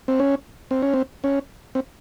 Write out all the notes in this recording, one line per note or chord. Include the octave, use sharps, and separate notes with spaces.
C4
C#4
C4
C#4
C4
C#4
C4